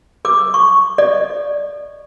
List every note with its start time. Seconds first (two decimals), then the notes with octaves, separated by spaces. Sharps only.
0.25 A4 D6 E6
0.54 C#6
0.98 A4 D5 D#5